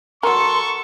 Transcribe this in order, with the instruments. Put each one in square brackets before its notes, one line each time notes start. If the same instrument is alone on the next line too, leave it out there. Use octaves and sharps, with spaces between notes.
[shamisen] F#3 A#4 [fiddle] A4 [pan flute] C6 [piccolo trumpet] C#6